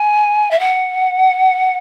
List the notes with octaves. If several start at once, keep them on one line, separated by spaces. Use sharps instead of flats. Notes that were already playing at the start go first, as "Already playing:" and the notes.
Already playing: G#5
E5
F#5